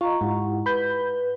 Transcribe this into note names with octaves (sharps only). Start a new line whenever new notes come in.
F4 D#5 A#5 C#6
G#2 E4 G4 F#5
B4 B5 G6